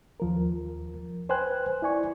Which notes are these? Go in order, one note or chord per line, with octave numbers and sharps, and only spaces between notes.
D#2 F3 A#4
B4 C5 G5 G#5 F#6
E4 D5 G#5 C#6